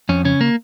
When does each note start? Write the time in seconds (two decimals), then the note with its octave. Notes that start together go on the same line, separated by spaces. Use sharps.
0.09 F2 C#4
0.25 C#3 C#4
0.41 A#3